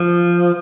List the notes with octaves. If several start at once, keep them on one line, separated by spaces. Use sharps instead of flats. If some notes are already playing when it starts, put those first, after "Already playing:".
Already playing: F3